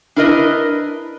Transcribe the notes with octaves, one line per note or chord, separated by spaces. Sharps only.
D4 E4 A#4 B4 D#5